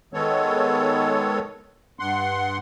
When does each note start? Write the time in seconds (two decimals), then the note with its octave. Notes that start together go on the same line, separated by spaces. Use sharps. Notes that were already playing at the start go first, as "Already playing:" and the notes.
0.14 D#3 G#3 B3 A4 C#5
2.00 G2 F#5 C6